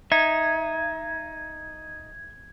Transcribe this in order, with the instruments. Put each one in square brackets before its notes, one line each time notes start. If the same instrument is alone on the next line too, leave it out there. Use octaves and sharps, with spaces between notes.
[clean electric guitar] D#4 [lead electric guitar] E5 [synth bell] G#6